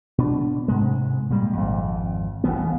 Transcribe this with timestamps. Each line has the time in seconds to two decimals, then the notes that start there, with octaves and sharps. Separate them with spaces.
0.18 B2 D4
0.68 G#2 C3 G#3
1.30 A#2 G3 G#3
1.53 G#1 F2
2.44 D#1 F2 E3 B3